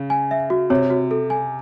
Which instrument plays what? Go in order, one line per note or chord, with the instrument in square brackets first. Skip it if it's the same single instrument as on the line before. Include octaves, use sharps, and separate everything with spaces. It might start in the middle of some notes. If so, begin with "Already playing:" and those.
Already playing: [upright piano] C#3
[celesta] G#5
E5
F#4
[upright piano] C3 [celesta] C#5
[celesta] F#4
A4
G#5